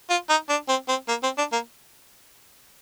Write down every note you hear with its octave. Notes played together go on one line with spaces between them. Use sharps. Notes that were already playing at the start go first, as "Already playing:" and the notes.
F4
D#4
D4
C4
C4
A#3
C4
D4
A#3